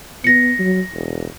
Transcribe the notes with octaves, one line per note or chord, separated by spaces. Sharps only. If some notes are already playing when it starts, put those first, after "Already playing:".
B3 A#6 C#7
F#3
E1